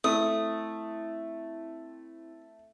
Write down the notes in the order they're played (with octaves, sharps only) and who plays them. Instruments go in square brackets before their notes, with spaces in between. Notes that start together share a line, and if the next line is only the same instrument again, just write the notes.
[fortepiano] A3 [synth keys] C4 E4 [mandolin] D#6